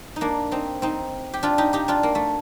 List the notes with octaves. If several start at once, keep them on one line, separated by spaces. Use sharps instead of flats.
D#4
A#3 D4
C4 D#4
C4 D#4
G4
D4 F4
D#4 G4
D#4 G4
D4 F4
A#3
A3